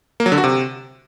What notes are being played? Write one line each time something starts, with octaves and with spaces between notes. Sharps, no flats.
A#3
F#3
D3
F#4
C3